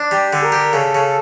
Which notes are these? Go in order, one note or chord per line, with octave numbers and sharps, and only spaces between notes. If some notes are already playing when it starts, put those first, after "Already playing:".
Already playing: D4
G3 G4
D3
A#4
G4
C#3 A4
C#3